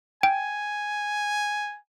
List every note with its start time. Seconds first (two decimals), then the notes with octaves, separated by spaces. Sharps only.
0.23 G5 G#5